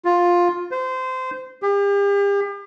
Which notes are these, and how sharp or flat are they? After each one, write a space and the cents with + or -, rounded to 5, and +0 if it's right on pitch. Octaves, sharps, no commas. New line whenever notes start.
F4 +10
C5 -25
G4 +40